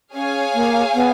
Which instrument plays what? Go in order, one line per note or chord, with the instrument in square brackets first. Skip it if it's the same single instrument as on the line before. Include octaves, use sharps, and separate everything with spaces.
[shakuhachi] C#4 [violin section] G#4 C#5 F5 G#5
[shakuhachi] A#3
B3